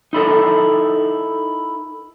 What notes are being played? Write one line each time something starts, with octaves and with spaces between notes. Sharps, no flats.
D#4 E4 A4 A#4